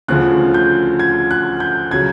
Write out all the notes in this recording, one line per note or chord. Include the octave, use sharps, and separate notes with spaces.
D2 C#3 F3 F#6
G6
G#6
F#6
G6
C#3 F#3 G#6